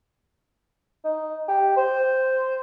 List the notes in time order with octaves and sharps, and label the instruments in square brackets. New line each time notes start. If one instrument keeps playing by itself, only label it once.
[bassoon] D#4
G4
C5